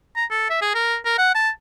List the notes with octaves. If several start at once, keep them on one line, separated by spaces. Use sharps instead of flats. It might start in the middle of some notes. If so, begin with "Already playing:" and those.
A#5
A4
E5
G#4
A#4
A#4
F#5
A5